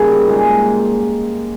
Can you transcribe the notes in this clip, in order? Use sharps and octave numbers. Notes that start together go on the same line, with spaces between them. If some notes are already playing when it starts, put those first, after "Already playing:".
Already playing: C#3 G3 A#3 D#4
A#2 G#3 D#4